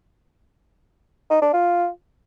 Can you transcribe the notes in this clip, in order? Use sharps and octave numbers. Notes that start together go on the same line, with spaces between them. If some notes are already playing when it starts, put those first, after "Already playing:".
D#4
D4
F4